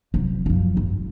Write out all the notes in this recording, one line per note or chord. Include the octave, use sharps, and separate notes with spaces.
C2 F#3
F#2 F3
G#1